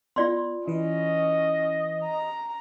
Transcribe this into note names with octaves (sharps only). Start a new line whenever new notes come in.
B3 F4 D5 C6
E3 C#4 B4 D#5
A#5